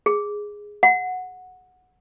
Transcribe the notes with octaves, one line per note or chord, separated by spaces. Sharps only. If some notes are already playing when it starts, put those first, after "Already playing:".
G#4
F#5